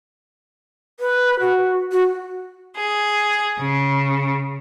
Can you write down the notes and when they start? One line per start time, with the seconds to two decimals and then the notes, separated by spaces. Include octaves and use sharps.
1.00 B4
1.40 F#4
1.92 F#4
2.75 G#4
3.59 C#3